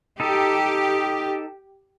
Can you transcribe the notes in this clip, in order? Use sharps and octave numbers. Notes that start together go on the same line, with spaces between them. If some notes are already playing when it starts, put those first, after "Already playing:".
D#4 G4 A4